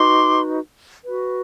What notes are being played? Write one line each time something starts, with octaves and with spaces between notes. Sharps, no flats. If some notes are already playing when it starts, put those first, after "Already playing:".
Already playing: D#4 F#4 B4 C6 D6
F#4 B4